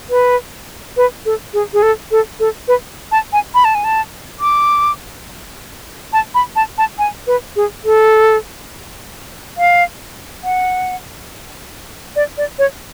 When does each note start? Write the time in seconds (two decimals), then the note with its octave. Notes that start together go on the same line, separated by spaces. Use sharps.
0.10 B4
0.97 B4
1.26 A4
1.54 G#4
1.74 G#4
1.83 A4
2.11 A4
2.40 A4
2.68 B4
3.12 A5
3.33 G#5
3.55 B5
3.65 A5
3.75 G#5
3.84 A5
4.40 D6
6.13 A5
6.35 B5
6.56 A5
6.78 A5
6.99 G#5
7.27 B4
7.56 G#4
7.85 A4
9.58 F5
10.44 F#5
12.16 D5
12.37 D5
12.59 C#5